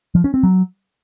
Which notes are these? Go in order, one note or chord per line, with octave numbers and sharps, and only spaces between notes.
F3
C#4
C4
F#3